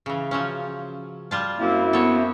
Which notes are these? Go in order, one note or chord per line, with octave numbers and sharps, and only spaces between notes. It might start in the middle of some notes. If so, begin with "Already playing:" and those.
C#3 E3
F3 F#3 C#4
G3 F4 A5
F#2 A#3 C4 E4
B3 A4 C#5